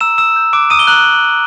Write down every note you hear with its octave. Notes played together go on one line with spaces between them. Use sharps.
A#5 E6 E7
D#6 E6 E7
G6
D6 F#6 D7
A#5 D#6 D#7
G7
A#5 F#6 F#7